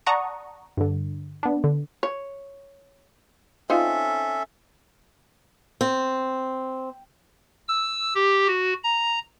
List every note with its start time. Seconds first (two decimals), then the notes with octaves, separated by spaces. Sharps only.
0.06 D5 F#5 A5 A#5 C#6 D#6
0.77 G2 D3
1.43 B3 D4
1.64 D3
2.03 C#5
3.70 C4 C#4 D#4 F4 A4 E5
5.81 C4
7.68 E6
8.15 G4
8.47 F#4
8.83 A#5